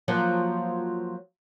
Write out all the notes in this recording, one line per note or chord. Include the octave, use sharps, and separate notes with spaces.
F3 F#3 A#3